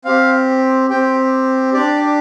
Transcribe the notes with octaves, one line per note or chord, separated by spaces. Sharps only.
C4 G4 F5
C4 G4 G5
D4 G4 D5